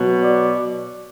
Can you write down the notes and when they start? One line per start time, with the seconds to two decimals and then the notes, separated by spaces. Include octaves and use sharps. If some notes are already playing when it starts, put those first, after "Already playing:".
Already playing: B2 F#3
0.24 D5